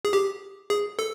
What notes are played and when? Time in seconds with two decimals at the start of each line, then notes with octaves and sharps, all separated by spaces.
0.05 G#4
0.13 G4
0.70 G#4
0.99 A4